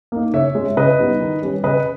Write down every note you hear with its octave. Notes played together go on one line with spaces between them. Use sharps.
A#3 D#4
C#3 C#5 E5
G#3 C#4
C#3 B4 D#5
G3 B3 D#4
D#3
G3 C#4
C#3 B4 D#5